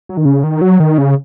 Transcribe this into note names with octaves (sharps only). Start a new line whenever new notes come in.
F#3
D#3
C#3
D#3
F#3
D#3
C#3